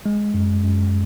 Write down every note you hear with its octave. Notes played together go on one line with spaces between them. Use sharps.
G#3
F#2
F#2